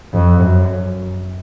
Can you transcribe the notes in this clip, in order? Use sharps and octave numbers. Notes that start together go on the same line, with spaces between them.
F2
F#2